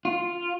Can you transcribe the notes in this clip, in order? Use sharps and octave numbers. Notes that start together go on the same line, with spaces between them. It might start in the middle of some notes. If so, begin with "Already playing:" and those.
F4